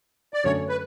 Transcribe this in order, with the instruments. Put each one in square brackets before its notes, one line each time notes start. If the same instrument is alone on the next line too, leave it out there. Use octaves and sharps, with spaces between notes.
[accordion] D5
[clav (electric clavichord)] F#2 D3 A3 C#4 [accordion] C#5
[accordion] B4